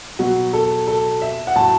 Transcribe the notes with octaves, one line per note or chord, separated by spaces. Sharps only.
B2 F#3 F#4
A4
A4
E5
F#5
A2 F#3 A5